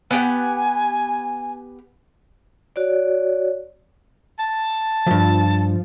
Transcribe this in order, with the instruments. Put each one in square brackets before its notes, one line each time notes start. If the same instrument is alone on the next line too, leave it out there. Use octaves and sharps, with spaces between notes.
[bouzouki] B3 G4 F#5 [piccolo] G#5
[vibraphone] F#4 C#5 D5
[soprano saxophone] A5
[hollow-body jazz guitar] C#2 G2 [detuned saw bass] F3